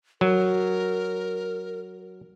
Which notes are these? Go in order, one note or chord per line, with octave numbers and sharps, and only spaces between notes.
F#3 A#4